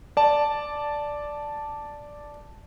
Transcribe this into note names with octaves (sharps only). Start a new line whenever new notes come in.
D5 A5